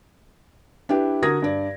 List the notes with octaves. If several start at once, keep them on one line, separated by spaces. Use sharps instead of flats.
D4 E4 G4 B4
D3 F#4 A#4 D#6 G#6 A#6
G2 D5